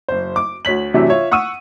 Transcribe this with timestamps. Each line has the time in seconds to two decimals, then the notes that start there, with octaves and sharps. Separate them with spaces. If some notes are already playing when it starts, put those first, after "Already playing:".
0.08 F#1 C5
0.36 D6
0.65 D2 C#5 B6 F#7
0.94 F#2 C3 E3 F#3 A3 D4
1.09 F4 C#5 E5
1.31 F#5 C#6 D#6 E6 D#7